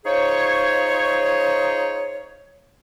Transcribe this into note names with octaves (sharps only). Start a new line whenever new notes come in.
D#4 F4 G#4 C5 C#5